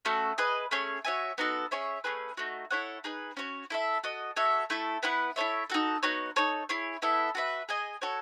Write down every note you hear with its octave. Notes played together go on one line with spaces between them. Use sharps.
A3 C#4 F#4 A4
G#4 B4 D#5
A3 C#4 G#4 C#5
F#4 C#5 E5 G#5
B3 D#4 F#4 A4
C#4 G#4 C#5 E5
A3 C#4 G#4 B4
A3 D#4 F#4
E4 A4 C#5 F#5
D#4 G#4 B4
C#4 F#4 C#5
E4 A4 E5
F#4 A4 D#5
F#4 A4 C#5 E5
A3 E4 A4
B3 E4 B4 F#5
E4 A4 C#5 E5
D#4 F#4 A4
B3 D#4 F#4 C#5
D#4 A4 C#5
E4 G#4 C#5
B3 E4 A4 E5
F#4 B4 E5
G#4 D#5 G#5
F#4 A4 C#5